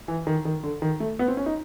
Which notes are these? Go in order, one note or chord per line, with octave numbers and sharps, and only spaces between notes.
E3
D#3
D#3
D3
D#3
A3
B3
C4
C#4
D#4